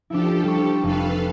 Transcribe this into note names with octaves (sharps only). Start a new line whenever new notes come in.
F3 D4 E4 G4 A4
G3 C#6
F1 A4 B4 F5